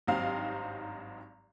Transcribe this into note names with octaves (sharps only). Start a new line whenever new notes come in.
G#1 G2 F#3 C4 D#4 F5